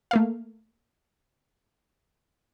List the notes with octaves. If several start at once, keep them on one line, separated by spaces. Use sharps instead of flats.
A3 A#3 F5